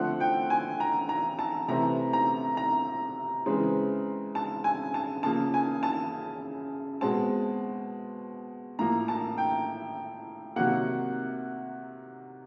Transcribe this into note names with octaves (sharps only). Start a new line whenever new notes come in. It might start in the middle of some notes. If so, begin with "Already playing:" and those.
Already playing: D3 F3 A3 C4 F#5
G5
G#5
A#5
A#5
A5
C3 E3 A3 C4 A#5
A#5
A#5
C#3 E3 G#3 C4
A5
G#5
A5
C#3 F3 A#3 A5
G#5
A5
B2 G#3 C4 A5
A2 F3 A#3 A#5
A5
G5
C3 D#3 F#3 A#3 F#5